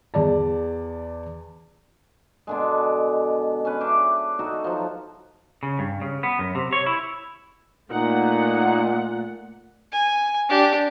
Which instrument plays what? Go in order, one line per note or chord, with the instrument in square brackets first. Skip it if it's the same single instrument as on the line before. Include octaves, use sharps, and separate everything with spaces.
[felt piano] E2 D5 A5
[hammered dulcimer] B2 D3 G#3
C#4 B4
D4 E5 G5 D6
D#4 F#4 A4
F3 F#3
[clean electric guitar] C#3
G2
C#3
B3
F#2
C3
C#5
E4
[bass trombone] A#2 [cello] A3 [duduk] D#4 [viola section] F#5
[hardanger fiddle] G#5
D4 G4